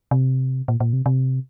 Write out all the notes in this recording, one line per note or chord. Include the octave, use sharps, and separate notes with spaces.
C3
A#2
A#2
C3
C3